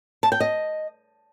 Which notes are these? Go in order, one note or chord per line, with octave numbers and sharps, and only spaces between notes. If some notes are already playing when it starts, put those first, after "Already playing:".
A5
G5
D#5